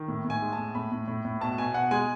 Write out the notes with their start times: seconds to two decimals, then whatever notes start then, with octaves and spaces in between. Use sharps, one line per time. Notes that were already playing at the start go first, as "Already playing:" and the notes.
Already playing: D#3
0.08 A2
0.25 A2
0.30 G#5
0.42 G#3
0.53 A5
0.58 A2
0.75 A2 B5
0.92 A2
1.08 A2
1.25 A2
1.41 B2 A5
1.58 B2 G#5
1.74 B2 F#5
1.91 G#3 G#5